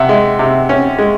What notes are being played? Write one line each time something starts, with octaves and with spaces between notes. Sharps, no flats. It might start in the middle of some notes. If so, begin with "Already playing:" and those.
Already playing: C3 E5 F#5
G#3
C3
C#4
G#3